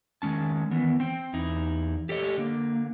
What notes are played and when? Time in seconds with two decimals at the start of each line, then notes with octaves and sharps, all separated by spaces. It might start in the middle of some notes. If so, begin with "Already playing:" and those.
0.22 D#3 G#3 C#4 A5
0.71 D#3 E3 B3
1.00 C4 G5
1.33 E2 D#4 E4
2.09 G4 A4 C#5 D#5
2.37 D3 A#3